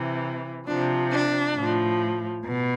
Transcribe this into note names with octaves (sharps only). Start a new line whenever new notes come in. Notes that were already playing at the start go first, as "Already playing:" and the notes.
Already playing: C3 E3
C3 F3 D4
D4
A2 F3
B2